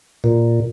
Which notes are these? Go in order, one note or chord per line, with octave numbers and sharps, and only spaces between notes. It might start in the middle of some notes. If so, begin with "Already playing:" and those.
A#2